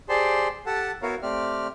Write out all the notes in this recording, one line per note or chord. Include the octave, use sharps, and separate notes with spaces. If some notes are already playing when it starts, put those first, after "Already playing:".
G4 G#4 C5 D5 A5 C6
G4 A4 F#5 A5
B3 E4 F#4 A#4 C#5 F5
A3 C4 G4 D5 F6